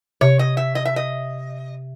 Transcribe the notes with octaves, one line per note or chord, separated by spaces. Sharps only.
C3 C#5
D#5
E5
D#5
E5
D#5